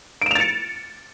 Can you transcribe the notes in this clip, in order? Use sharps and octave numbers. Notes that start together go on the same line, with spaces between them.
A6 C#7 D7 E7 F7